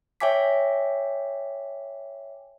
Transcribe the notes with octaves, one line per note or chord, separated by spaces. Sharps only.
C#5 E5 G5 G#5 D6 B6